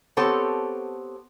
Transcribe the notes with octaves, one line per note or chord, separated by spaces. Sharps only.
B3 C4 G4 A4 C5 C#5